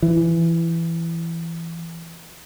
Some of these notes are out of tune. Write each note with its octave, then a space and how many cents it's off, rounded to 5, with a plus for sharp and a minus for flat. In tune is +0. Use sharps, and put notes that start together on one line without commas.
E3 +15